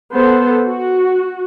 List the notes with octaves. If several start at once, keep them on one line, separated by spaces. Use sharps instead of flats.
B3 A4 C5
F#4